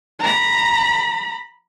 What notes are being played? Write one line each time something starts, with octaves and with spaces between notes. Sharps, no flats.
A#5 B5